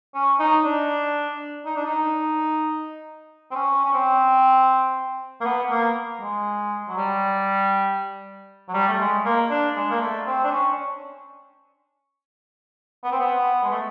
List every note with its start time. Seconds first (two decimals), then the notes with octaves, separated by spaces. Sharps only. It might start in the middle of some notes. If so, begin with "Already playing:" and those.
0.14 C#4
0.39 D#4
0.64 D4
1.66 D#4
1.76 D4
1.85 D#4
3.51 C4
3.55 C#4
3.85 C#4
3.93 C4
5.41 A#3
5.45 B3
5.70 A#3
6.21 G#3
6.88 F#3
6.97 G3
8.68 F#3
8.74 G3
8.88 A3
9.00 G#3
9.25 A#3
9.50 D4
9.76 G#3
9.90 A#3
10.00 A3
10.26 C4
10.44 D4
10.51 C#4
13.04 B3
13.11 C4
13.19 B3
13.63 G#3
13.71 A3